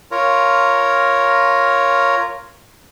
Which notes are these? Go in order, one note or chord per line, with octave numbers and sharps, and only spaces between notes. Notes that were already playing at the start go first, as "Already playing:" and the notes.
F4 A#4 C#5 A#5